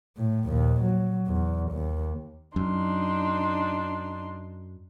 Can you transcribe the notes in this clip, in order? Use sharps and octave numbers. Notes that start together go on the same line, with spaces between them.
A2
A#1 D#2
F#3
E2
D#2
F#2 D4 D#4 C6